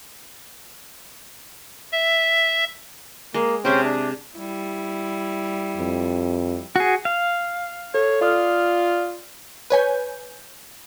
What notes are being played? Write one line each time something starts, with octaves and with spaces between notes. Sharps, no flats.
E5
G#3 A#3
C3 C#4 G#4 C5 E5 G5
D4
G3 E4
F2
F#4 G#4
F5
A4 C#5
F4 D5 D#6 F6
B4 C#5 G#5 G6